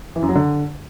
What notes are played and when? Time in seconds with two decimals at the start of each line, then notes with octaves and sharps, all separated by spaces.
0.16 E3
0.22 F#2
0.29 F#3
0.35 D3